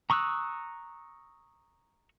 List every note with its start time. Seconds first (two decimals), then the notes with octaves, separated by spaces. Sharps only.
0.10 A#5 C#6 D#6 E6 F#6